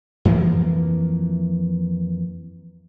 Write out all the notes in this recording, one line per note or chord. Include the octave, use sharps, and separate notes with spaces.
F2 E3 F3 A#3